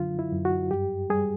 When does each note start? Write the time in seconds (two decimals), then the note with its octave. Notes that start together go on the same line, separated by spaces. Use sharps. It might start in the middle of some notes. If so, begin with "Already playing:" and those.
Already playing: F#2 D3 F#3 F4
0.19 E4
0.32 F#2
0.45 F#4
0.71 G2 G4
1.10 G3 G#4